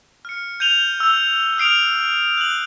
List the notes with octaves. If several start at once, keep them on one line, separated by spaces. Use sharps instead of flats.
F6 C#7
G6 D#7 F7 G7
E6 G6
D#6 F6 C7 D7 F7
F#6 F#7